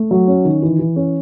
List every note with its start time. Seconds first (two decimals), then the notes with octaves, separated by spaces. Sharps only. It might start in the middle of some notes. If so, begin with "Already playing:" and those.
Already playing: A3
0.11 F#3
0.28 C#4
0.45 D#3
0.62 E3
0.79 E3
0.96 C#4